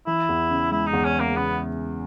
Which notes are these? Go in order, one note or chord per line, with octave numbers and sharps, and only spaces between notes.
E3 E4
E2
C#3
G#3 E4
D#4
E2
C#4
C#3
A#3
C#3 B3